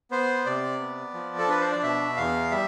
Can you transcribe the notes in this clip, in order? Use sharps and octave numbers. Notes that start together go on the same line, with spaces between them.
B3 C5
C3 D5
B3
F3
A4
D4 B4
C5
D5
B2 E5
E2 F5
G3 E5